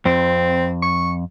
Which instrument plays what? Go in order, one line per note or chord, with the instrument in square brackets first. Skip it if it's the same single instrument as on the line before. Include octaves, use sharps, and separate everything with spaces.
[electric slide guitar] F2 [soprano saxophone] C4
[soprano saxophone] C#6